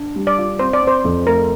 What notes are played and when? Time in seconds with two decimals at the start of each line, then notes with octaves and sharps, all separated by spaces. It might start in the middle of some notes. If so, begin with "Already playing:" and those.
Already playing: D4
0.16 G3
0.27 D5
0.38 F4
0.59 C4 C5
0.73 D5
0.82 C4
0.87 C5
1.04 F2
1.27 A3 A#4